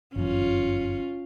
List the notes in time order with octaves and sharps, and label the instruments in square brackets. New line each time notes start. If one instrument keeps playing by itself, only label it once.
[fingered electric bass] G1 F#2 E3 [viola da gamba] C#4 F4